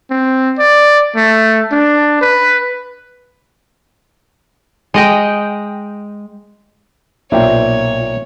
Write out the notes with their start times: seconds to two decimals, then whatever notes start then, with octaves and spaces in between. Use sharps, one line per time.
0.10 C4
0.59 D5
1.16 A3
1.71 D4
2.21 B4
4.94 G#3 D#5 G5
7.32 B1 A#2 A#3 C5 C#5 E5 G5